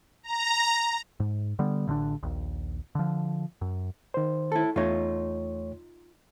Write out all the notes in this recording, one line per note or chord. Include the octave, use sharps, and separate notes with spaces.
A#5
G#2
D3 G3 B3
A1 D3 G#3 D4
A#1 D#2
D3 F3
F#2
D#3 C5
E4 A4
E2 A3 D#4 F4 C#5